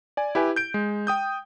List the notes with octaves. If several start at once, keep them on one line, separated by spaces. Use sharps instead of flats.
D5 G#5
E4 G4 B4 G#5
G6 D7
G#3
G5 D#6 G6